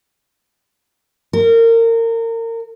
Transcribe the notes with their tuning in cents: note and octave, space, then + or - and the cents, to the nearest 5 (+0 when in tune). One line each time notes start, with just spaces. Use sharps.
A#4 -30